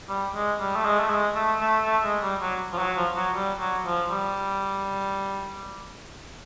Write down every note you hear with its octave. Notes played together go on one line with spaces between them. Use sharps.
G3
G#3
G3
A3
G#3
A3
G#3
A3
A3
A3
G#3
G3
F#3
F3
F#3
F3
F#3
G3
F#3
F3
G3